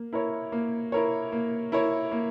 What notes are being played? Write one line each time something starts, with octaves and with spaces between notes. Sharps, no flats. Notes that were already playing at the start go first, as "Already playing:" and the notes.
Already playing: A#3
E4 A#4 C#5
A#3
E4 A#4 C#5
A#3
E4 A#4 C#5
A#3